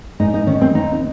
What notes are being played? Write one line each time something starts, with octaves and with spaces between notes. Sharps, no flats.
G#2 D#4
D#4
D#3 C#4
C4
D#2 D#4